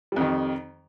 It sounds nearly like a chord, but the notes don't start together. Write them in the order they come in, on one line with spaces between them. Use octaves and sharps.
G3 F2 D#3